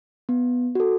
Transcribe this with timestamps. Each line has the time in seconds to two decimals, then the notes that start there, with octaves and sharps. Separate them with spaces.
0.29 B3
0.75 F#4 A4